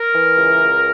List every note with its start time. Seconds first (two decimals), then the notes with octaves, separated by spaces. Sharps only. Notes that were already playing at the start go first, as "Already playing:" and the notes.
Already playing: A#4
0.13 E3
0.37 C#2
0.60 C#2